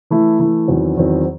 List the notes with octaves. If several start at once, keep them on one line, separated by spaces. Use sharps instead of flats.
E3 A3 E4
E3 A3 E4
E2 D#3 F#3 C4
E2 D#3 F#3 C4